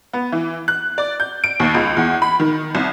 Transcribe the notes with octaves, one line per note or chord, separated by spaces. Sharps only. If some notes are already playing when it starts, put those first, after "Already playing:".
B3
E3
F#6
D5
G6
D7
D#2
C#2
E2
B5
D#3
C2